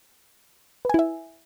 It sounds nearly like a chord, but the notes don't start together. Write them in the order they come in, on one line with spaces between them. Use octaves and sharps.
B4 G#5 E4 E5